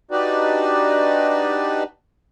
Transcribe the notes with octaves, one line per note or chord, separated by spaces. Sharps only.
D4 D#4 F#4 G4 B4 D5